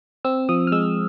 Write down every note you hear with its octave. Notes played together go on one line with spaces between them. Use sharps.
C4 E6
F3 D#6
F6
G#3 E6